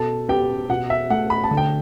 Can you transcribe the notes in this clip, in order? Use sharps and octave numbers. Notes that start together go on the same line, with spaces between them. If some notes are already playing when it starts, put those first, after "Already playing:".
Already playing: B2 A4 A5
B3 G4 G5
B2 F#5
E5
A3 F#5
B5
A5
D3
G5